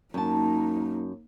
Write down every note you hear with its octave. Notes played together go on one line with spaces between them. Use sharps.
F#2 A#3 D#4 A5